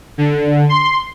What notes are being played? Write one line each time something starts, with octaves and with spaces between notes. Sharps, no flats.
D3
C6